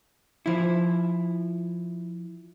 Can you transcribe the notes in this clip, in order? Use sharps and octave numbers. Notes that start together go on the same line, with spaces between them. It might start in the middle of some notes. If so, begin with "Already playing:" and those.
F3 E4